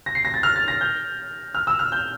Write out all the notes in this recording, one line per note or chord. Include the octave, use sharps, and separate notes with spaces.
A#6
C7
A#6
A6
F6
A6
A#6
G6
F6
E6
F6
G6